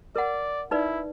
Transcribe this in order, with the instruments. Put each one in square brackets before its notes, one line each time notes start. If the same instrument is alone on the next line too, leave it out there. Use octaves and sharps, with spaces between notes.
[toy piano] A#4 F#5 [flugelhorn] D5
[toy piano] D#4 B4 D5 [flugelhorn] E4